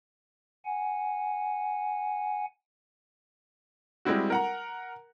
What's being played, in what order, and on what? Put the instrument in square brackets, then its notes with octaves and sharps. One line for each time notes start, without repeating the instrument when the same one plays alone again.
[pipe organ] F#5 G#5
[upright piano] G3 G#3 C4 E4 F#4
A#4 F#5 A#5